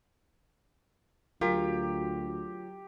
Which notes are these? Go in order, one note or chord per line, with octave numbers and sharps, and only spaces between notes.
D2 F#3 F4 G4 A#4